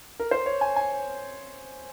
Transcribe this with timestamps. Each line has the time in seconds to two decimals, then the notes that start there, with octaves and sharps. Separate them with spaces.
0.20 A#4
0.31 C5
0.46 C#5
0.61 G#5
0.76 G#5